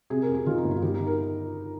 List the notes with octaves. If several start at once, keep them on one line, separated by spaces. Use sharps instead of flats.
C3 G#4
A#4
F2
G#4
D#3 F4
D#4
G1
F4
D#3 G4
D#4
A#4